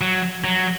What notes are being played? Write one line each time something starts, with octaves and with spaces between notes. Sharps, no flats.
F#3
F#3